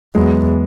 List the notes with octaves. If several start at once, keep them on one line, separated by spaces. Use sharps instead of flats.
E2 F#3 G#3